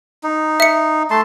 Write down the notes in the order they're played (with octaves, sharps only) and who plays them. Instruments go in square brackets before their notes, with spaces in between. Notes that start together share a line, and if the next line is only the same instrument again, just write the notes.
[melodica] D#4
[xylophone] E5 C#7
[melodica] A3 A5 C6